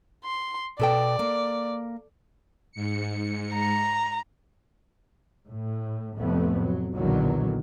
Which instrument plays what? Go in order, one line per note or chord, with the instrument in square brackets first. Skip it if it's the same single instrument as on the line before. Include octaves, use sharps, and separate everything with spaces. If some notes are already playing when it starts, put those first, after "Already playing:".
[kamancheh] C6
[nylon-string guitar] B2 A4 G5 [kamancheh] D5
[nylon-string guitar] A#3
[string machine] G#2 C#7
[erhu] A#5
[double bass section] A2
C2 F2 A2 C3 A3 B3
F#3
B1 E2 A#2 D3 D#3 F#3